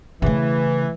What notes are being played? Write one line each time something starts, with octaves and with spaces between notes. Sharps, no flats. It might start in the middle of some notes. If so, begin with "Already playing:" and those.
C#3 E3 A3